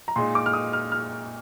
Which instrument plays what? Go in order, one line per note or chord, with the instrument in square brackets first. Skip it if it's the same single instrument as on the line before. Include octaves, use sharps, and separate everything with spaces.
[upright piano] A#5
[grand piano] A#2 G#3 D#4 [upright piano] C6
[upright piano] D6
F6
D#6
F6
F6